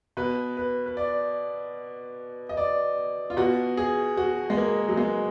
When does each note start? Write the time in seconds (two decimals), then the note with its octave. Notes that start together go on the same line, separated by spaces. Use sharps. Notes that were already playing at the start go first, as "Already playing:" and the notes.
0.17 B2 B4
0.57 B4
0.86 B4
0.97 D5
2.49 D#5
2.57 D5
3.30 F4
3.37 B2 F#4
3.77 G#4
4.17 F#4
4.50 G#3
4.57 A#3
4.88 F#3
4.97 G#3